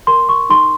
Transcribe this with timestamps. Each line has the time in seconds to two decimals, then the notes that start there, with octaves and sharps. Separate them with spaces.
0.07 A#4 C6
0.29 C#6
0.50 D#4 C6